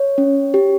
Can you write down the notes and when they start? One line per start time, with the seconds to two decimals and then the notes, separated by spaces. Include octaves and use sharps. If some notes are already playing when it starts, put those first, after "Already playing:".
Already playing: C#5
0.18 C#4
0.54 G4